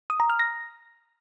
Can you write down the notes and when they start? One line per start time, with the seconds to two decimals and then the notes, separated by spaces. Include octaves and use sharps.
0.10 D#6
0.20 A#5
0.30 F6
0.39 A#6